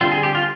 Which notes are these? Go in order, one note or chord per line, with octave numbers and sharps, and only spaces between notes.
D3 G3 C4 F4
G#4
G4
F4